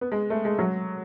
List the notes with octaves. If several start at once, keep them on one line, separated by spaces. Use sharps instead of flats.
B3
G#3
A3
G#3
F#3